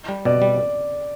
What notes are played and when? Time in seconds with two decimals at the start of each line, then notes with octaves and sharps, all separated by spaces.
0.09 G3
0.25 B2 D5
0.42 G3